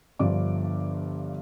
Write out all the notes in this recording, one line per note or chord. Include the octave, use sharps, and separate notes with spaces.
G1 G2 F3 D5 D6